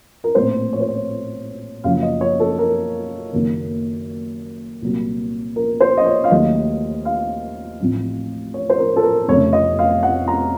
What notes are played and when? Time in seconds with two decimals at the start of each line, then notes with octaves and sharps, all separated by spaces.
0.24 A#4
0.35 A#1 A2 A3 C4 C5
0.73 C#5
0.80 C5
0.88 C#5
1.84 F#1 F#2 C#3 F3 F5
2.02 D#5
2.21 C#5
2.40 A4
2.59 A#4
3.33 F#1 F#2 D#3 A#3
4.82 C2 A#2 F#3 A#3
5.56 A#4
5.81 C5
5.97 D#5
6.06 C#5
6.24 F5
6.30 D#2 D#3 F#3 A3 D#5
7.05 F5
7.80 A1 A2 F3 C4
8.54 C#5
8.70 C5
8.78 A#4
8.96 A4
9.03 A#4
9.28 F1 F2 C#3 A3 C#5
9.53 D#5
9.79 F5
10.03 F#5
10.28 A#5